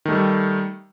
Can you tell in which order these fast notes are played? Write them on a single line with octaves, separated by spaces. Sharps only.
D#3 A3 G3